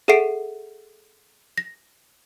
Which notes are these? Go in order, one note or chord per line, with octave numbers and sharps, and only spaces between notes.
G#4 A4 E5 F#5 C7 D7
A#6